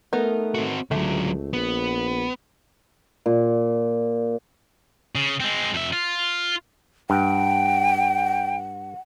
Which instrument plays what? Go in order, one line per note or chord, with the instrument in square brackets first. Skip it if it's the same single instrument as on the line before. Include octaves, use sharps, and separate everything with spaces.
[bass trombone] A3 [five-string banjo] B3 D#4 A#4
[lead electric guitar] C4 F#4
[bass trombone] C#2 [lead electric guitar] D3 F#3 [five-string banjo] A3 E5 A5
[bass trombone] A#1 [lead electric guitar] B3
[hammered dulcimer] A#2
[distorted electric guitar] C#3
G#3 C4
F2 E5
F4
[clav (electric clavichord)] G2 [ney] F#5 [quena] G5